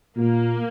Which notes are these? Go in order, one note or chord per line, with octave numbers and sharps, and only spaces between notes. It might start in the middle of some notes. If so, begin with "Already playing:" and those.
A#2 A#3